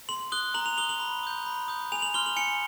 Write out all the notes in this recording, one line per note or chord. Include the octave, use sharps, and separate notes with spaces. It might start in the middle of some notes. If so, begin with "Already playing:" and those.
C6 F#7
D#6 F#6 G7
A#5 F#7
F7
D#6 F#6 G7
F#7
B5
D#6 G6
B5
D#6 G6
G#5 F7
F#7
C6 F6 G7
F#7
G#5 C#7